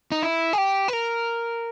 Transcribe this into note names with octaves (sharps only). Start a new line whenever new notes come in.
D#4
E4
G#4
G4
B4
A#4